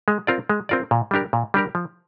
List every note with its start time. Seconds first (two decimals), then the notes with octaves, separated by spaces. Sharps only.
0.08 G#3
0.27 C4 F4 A#4 D5
0.49 G#3
0.69 C4 F4 A#4 D5
0.91 A#2
1.11 G3 D4 G4 A#4
1.33 A#2
1.54 G3 D4 G4 A#4
1.75 F3